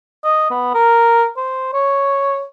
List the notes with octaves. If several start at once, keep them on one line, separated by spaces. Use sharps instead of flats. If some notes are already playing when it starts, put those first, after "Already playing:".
D#5
B3
A#4
C5
C#5